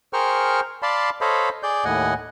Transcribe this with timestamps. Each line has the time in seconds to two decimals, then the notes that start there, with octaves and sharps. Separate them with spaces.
0.13 G#4 A#4 C5 G5 C#6 F6
0.82 D5 F5 A5 B5 C6
1.21 A4 C5 C#5 D#5 F5 B5
1.63 G#4 D5 G6
1.85 D#2 A2 D#5 F#5 G#5